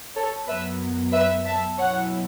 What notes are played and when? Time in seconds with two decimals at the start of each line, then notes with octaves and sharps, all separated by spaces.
0.15 A4 C#5
0.47 F#2 F#3 B3 B4 E5
1.12 B4 E5
1.45 E5 A5
1.78 B2 F#3 C#4 E4 C#5 F#5